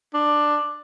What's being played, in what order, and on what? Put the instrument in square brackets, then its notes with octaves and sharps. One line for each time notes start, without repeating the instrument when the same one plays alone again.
[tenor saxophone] D4